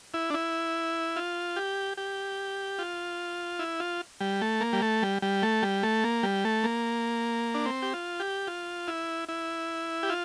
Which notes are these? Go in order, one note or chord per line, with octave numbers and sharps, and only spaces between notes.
E4
D4
E4
F4
G4
G4
F4
E4
F4
G3
A3
A#3
G3
A3
G3
G3
A3
G3
A3
A#3
G3
A3
A#3
D4
C4
G4
F4
G4
F4
E4
E4
G4
F4